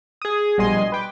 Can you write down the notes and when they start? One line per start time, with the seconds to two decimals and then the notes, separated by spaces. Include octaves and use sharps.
0.22 G#4 D#6
0.58 A#1 B2 G3 D#5 G#5 C6
0.92 B4 G5 D6